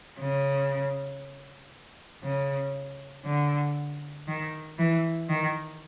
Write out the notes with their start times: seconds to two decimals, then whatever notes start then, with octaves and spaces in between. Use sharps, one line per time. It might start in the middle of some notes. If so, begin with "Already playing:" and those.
0.20 C#3
2.23 C#3
3.25 D3
4.28 D#3
4.79 E3
5.29 D#3